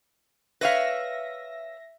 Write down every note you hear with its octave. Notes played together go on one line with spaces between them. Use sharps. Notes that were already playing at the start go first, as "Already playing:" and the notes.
B4 C#5 E5 F5 A#6